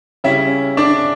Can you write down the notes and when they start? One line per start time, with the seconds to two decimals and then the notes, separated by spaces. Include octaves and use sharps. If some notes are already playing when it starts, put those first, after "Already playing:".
0.24 C#3 G3 C#4 E4 E5
0.77 D4 D5